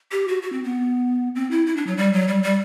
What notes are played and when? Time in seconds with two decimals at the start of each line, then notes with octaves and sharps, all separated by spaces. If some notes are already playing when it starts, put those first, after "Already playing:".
0.11 G4
0.28 F#4
0.42 F#4
0.53 C4
0.64 B3
1.35 C4
1.51 E4
1.67 E4
1.77 D4
1.87 F#3
1.97 G3
2.13 F#3
2.28 G3
2.43 G3